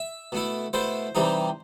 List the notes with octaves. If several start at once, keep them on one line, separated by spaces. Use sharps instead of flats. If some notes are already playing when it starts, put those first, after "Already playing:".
Already playing: E5
B2 A3 E4
B2 A3 E4 C5
C3 E3 G3 D#4